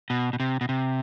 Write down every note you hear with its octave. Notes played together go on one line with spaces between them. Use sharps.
B2
B2
C3
B2
C3